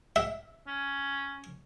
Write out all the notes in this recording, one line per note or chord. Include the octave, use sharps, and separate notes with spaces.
E5
C#4